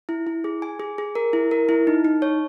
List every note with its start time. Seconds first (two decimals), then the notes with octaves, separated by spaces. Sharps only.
0.09 E4
0.27 E4
0.44 G#4
0.62 G#5
0.80 G#4
0.98 G#4
1.15 A#4
1.33 E4
1.51 A#4
1.69 E4
1.87 D#4
2.05 D#4
2.22 C#5